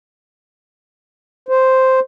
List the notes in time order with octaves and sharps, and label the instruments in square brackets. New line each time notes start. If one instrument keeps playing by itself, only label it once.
[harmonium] C5